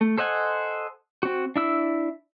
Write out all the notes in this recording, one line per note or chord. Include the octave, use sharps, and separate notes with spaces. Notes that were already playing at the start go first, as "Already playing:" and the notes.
A3
A4 C5 D#5 F#5 G#5
C4 F#4
D4 E4 E6